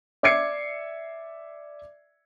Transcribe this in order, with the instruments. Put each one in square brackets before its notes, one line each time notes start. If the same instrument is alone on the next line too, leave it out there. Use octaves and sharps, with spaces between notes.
[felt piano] D5 E5 D6 G#6 C7 C#7